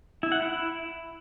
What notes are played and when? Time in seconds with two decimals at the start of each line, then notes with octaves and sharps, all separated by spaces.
0.23 E4
0.32 F#5
0.40 E4